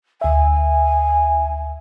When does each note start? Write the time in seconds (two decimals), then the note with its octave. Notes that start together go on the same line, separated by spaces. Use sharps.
0.21 D2 E5 G#5